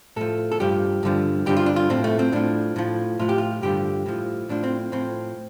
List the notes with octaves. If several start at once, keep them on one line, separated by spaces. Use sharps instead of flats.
A2 F3 A4
A4
G2 F3 G4
G2 D3 F3
G2 D3 F3 G4
F4
D4
F4
A2 F3 C4
A3
C4
A2 F3 D4
A2 F3
A2 F3 F4
G4
F4
G2 D3 F3 G4
A2 F3
A2 F3 D4
C4
A2 F3 C4